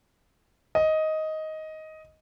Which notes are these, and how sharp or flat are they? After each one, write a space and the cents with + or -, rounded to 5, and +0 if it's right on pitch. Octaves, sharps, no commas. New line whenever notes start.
D#5 +10